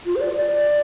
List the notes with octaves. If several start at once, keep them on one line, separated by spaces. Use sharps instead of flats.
F4
C5
D5
D5